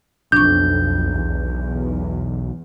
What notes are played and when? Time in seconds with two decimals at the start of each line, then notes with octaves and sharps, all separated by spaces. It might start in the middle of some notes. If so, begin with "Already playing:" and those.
0.32 B1 F2 D4 C#6 G6
1.14 E2